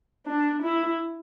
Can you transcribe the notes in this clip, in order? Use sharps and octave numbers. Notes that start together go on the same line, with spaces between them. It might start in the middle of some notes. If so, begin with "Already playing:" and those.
D4
E4